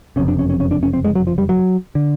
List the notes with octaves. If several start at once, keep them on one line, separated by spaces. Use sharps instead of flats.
F#1 F2 C3 C#4
D4
C#4
C#4
C#4
D4
C#4
C4
G#3
F#3
F3
G3
F#3
D3